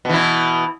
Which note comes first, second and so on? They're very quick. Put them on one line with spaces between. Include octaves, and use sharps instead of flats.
B2 E3 E4